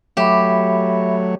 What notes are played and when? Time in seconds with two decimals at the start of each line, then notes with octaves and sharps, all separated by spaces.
0.17 F#3 A3 G4 C#5 E5 B5